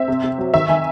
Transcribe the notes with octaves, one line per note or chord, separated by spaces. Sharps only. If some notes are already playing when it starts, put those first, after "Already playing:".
Already playing: C4 E5
C3
C3
F#3
D#3 E5
D#3 G#5